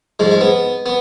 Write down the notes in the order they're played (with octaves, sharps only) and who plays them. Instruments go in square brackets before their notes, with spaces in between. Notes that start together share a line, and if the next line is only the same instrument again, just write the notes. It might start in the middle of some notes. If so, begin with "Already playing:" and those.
[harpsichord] G#2 F3 G#3
G#3
B3
B3